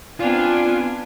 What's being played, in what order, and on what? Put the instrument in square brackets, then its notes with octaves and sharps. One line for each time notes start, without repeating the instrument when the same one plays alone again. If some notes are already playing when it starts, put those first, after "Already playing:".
[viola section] B3 G#5 [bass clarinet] C4 [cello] D4 [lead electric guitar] F4